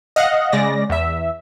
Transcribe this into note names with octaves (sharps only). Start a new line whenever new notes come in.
D#5 F5 F#5
C#3 G#3 D5 A#6
E2 E5